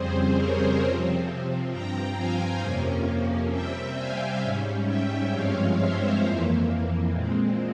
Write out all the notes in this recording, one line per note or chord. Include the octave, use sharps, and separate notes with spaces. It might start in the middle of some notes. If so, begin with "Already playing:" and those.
Already playing: F2 C#3 G3 C4 G#4 C5
A#4 C#5
C3 F3 C4
G2 F3 C4 G5 A#5
F5 G#5
F2 C3 F3 A#3 C#4
C3 G3 C4 E5 G5
F5 G#5
G#2 G3 C#4
E5 G5
G2 F3 G#3 C4 C#5 F5
C5 E5
F2 E3 A#3
A#2 G#3 C4